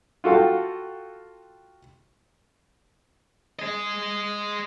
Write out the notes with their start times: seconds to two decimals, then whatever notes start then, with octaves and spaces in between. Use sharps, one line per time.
0.24 F4 F#4 A4 F5 G5
3.59 G#4 D#5